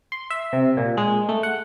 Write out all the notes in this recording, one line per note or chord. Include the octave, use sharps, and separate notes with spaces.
C6
E5
C3
A#2
G#3
A3
F#5